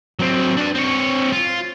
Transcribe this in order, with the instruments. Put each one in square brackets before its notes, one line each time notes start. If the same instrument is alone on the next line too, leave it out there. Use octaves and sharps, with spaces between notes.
[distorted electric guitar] F#3 C4
D4 B4
C4 C#5
F4